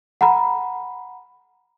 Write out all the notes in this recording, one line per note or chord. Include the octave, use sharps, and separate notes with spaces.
F#5 A#5 B5